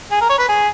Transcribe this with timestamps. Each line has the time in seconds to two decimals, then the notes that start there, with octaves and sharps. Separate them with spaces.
0.11 G#4
0.21 A#4
0.30 C#5
0.39 B4
0.49 G#4